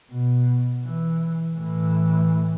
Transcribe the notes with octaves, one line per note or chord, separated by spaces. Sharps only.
B2
E3
A2 E3